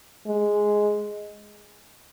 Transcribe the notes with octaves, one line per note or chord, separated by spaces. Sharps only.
G#3